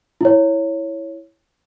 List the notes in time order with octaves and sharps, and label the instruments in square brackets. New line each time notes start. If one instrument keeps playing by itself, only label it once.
[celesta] E4 C#5